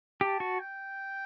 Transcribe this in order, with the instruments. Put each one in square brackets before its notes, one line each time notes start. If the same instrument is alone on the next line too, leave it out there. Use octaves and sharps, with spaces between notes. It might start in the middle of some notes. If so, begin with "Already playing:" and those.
[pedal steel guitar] G4 [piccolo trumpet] A5
[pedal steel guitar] F#4
[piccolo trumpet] G5